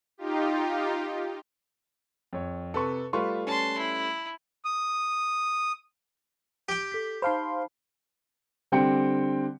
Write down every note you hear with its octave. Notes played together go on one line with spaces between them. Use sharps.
D#4 F4 G4
F2 C#5
C3 A4 B4 C#6
G3 A3 F4 B4 C6 C#6
C#4 A5 C6
E4
D#6
G4 G5
A4 B6
D#4 C5 F5 A5 B5 C6
D3 G3 C4 G5 C#7